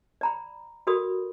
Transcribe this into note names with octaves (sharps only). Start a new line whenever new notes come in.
D5 A#5 B5
F#4 A4 A#4 D5 B5 D#6